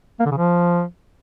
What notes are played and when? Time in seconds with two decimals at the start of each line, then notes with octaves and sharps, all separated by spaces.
0.20 A#3
0.25 D3
0.31 C#3
0.37 F3